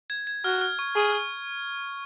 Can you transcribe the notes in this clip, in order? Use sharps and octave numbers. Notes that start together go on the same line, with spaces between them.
G#6
G#6
F#4 F6
F6
C#6
G#4 C#6
F6